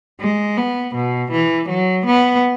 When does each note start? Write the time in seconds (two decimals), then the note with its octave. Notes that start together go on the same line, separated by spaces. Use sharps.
0.21 G#3
0.57 B3
0.95 B2
1.32 E3
1.69 F#3
2.06 B3